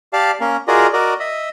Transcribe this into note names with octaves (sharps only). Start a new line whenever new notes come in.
G4 D5 F5 A5
A#3 C#4 A#4
F4 F#4 G#4 A#4 D5 D#5
F#4 A#4 D5 D#5
D#5 E5